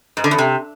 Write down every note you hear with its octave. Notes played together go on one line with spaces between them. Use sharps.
G#2
D3
E2
C3